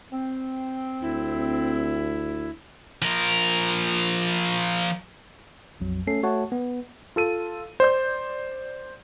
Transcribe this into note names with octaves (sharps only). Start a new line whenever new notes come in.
C4
D2 E4
F3 A#4
A#1 F2 F#3
A3 C#4 A4 C7
A3 F#4 C#5 F#5 A5
B3
F4 A4 D#7
C5 D5 G6